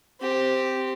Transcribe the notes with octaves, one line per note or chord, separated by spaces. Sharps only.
C4 G4